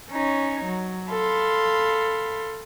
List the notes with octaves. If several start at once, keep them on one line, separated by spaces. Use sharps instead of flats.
C#4 D#4 C#5
F#3
A4 F5 B5 C6